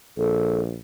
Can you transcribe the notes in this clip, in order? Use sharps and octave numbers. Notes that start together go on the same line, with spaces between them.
A#1 A4